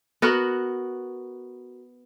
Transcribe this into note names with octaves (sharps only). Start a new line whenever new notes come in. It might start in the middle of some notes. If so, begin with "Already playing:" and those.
B3 F#4 A#4